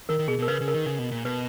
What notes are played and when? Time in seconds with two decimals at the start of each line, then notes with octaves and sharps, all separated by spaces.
0.09 D#3 A#4
0.19 D#3
0.28 B2 G#4
0.39 B2 A#4
0.48 C#3 B4
0.61 C#3
0.68 A#4
0.74 D#3
0.86 C#3
0.99 B2
1.11 A#2
1.25 B2 B4